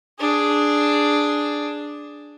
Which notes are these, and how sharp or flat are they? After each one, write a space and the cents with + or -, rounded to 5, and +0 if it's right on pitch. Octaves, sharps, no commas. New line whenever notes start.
D4 +0 G#4 +0